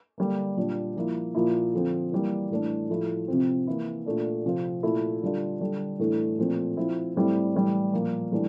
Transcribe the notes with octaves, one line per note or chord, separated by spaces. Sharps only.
D3 G3 A#3
A#2 G3 D4
F3 A#3 E4
A#2 F3 A#3 E4
D3 F3 C4
E3 G3 A#3
A2 E3 A3 D4
A2 F3 A3 E4
C3 F3 C4
E3 A#3 E4
A#2 A3 D4
C3 F3 C4 F4
A#2 A3 E4
D3 G3 D4 F4
D3 G3 D4
A2 E3 A3 D4
A#2 F3 A3 C4
F3 C4 E4
A2 G3 C4 E4
A2 E3 G3
A#2 F3 A#3
A2 E3 G3 D4